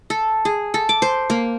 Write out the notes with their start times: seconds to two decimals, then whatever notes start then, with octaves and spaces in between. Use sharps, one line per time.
0.10 A4
0.45 G#4
0.74 A4
0.89 D6
1.02 C5
1.30 A#3